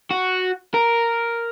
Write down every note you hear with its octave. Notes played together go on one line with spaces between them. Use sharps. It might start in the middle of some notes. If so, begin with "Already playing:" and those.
F#4
A#4